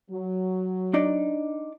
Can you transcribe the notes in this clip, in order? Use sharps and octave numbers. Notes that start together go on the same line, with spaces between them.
F#3
D4 D#4 D5